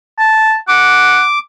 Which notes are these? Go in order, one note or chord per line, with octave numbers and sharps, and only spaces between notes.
A5
F#5 D6